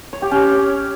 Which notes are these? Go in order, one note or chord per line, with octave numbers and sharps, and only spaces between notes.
C#5
G4
C#4